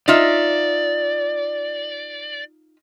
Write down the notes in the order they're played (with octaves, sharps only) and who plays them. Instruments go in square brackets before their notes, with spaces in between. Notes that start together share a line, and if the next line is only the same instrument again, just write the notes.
[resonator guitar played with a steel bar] D#4 F4 E5 [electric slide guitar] D5